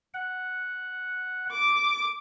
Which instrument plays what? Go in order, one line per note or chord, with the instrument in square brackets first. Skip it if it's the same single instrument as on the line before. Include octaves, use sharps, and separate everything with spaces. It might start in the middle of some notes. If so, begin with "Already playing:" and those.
[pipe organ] F#5
[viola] D6